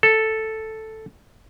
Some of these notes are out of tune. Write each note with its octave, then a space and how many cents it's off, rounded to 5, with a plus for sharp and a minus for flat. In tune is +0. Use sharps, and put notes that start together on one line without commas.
A4 +0